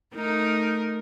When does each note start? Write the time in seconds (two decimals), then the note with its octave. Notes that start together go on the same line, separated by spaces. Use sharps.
0.14 A3 D#4 A#4